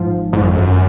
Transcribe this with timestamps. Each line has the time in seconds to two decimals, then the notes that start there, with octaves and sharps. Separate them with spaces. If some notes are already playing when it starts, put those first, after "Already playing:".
Already playing: G#1 G#2 F3
0.33 G#1 G#2
0.41 F#2
0.48 F2
0.55 F#2